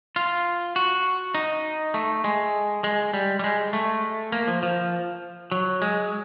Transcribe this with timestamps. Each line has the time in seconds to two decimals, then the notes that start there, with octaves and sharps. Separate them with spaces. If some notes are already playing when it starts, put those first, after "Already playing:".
0.16 F4
0.76 F#4
1.35 D#4
1.94 A3
2.24 G#3
2.84 G#3
3.14 G3
3.39 G3
3.44 G#3
3.73 A3
4.32 A#3
4.47 F3
4.63 F3
5.52 F#3
5.82 G#3